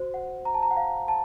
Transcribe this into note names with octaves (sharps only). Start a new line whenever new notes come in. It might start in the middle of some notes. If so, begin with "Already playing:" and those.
Already playing: F#4 C5
F#5
A#5
A5
A#5
F#5
F5
A5